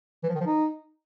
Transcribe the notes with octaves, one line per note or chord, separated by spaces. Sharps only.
E3
F3
D#3
F3
D#4